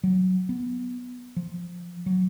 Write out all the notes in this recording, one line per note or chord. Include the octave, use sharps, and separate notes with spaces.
F#3
B3
F3
F#3